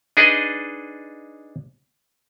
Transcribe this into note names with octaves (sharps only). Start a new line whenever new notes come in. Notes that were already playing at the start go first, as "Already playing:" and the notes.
D4 D#4 G#4 B4 D5 D#5